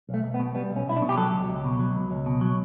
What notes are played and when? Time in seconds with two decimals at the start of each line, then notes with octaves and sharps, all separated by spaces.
0.09 B1
0.14 A3
0.24 B1
0.34 B3
0.39 B2
0.55 G3 B3
0.70 B1
0.76 C#4
0.86 B1 E4
0.96 D4
1.02 B2
1.09 G4
1.17 F#3 A4
1.33 C#2
1.49 C#2
1.64 B2
1.79 F#3
1.95 C#2
2.11 C#2
2.26 B2
2.41 F#3